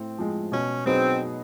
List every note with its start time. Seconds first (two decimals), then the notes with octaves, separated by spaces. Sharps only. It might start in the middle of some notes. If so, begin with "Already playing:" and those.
Already playing: A2 C4
0.18 F3 G#3
0.52 B2 C#4
0.86 F#3 B3 C4 D#4 G#4